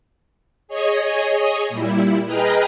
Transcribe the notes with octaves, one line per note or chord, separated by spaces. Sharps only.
G#4 C#5 D#5 G#5
A#2 G3 E4
G#4 B4 D#5 G5 A#5 F6